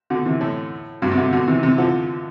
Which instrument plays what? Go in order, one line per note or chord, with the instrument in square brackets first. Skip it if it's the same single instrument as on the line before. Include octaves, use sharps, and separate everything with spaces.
[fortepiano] B2 D3
C3 E3
A2
G2 B2
C3
B2 D3
B2 D3
C3 E3
C3 E3
D3 F3